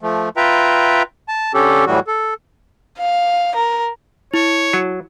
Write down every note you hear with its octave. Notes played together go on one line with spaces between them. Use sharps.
F3 A3
F4 B4 E5 G5 A#5
A5
D3 C#4 G4 A4
A2 E3 F#3 G3 F#4
A4
F5
A#4
E4 C#5
F#3